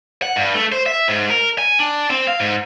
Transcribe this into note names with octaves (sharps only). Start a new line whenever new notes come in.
F#5
G2
A3
C5
E5
G#2
A#4
G#5
D4
C4
F5
G#2